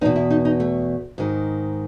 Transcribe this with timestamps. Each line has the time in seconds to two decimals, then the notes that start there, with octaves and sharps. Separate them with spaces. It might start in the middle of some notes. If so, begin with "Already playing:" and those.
0.01 E2 D#4
0.05 B2
0.16 E4
0.30 D#4
0.45 D#4
0.60 A3
1.18 G#2 D#3